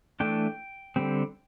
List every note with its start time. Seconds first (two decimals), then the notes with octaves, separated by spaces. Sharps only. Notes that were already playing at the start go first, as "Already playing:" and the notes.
0.20 E3 A3 D4 G5
0.96 D3 G3 C4